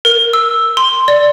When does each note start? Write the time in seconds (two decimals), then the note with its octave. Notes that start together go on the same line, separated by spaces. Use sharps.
0.05 A#4
0.33 E6
0.77 C6
1.08 D5